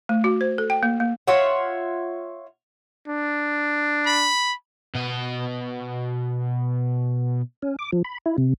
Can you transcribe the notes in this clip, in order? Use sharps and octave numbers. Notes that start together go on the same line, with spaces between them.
A3
F#4
C5
A4
G5
A#3
A#3
F4 C#5 E5 F#5
D4
B5
B2 D#5
C#4
D6
F3
B5
E4
C3